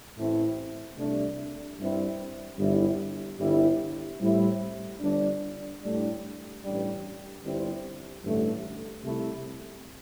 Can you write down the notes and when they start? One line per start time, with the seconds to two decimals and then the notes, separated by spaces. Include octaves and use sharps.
0.17 A1 A2 A3 C4 E4
0.98 C2 C3 A3 D4
1.78 G2 G3 C4 E4
2.59 G1 G2 G3 E4
3.39 G1 G2 G3 E4
4.20 A2 G3 C4 E4
5.00 G1 G2 G3 D4
5.81 A2 G3 D4
6.62 A1 G2 G3 D4
7.42 G1 G2 G3 C4 E4
8.23 A1 G2 D3 A3
9.03 C2 C3 A3 E4